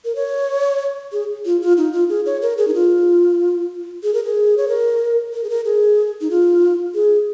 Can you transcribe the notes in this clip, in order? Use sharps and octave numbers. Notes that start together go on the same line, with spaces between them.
A#4
C#5
G#4
F4
F4
D#4
F4
G#4
C#5
A#4
G#4
D#4
F4
G#4
A#4
G#4
C#5
A#4
A#4
G#4
A#4
G#4
D#4
F4
G#4